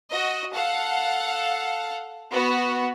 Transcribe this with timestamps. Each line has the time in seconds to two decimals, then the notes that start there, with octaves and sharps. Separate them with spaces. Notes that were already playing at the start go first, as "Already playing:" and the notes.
0.11 F#4 D#5
0.54 A4 F5 F#5
2.31 B3 F#4